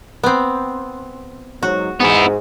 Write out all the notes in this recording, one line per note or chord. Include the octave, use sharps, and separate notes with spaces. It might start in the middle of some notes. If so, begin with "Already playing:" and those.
B3 C4
G#2 F#3 F#4
G#2 B3 E4